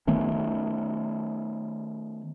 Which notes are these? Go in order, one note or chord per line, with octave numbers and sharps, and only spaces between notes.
D#3 A3 B3 C#4